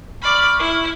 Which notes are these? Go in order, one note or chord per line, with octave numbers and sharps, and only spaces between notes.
D5 B5 C#6 F6
E4